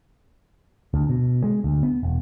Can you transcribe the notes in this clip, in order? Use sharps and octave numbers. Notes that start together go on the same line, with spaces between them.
D2
B2
G#3
D2
B3
E1